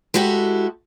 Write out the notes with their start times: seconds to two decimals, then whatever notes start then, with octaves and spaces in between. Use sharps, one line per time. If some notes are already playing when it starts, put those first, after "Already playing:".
0.14 G#3 E4 F#4 G4 A4